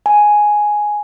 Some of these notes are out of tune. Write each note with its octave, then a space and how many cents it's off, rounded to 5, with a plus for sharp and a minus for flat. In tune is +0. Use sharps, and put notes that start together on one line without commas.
G#5 +5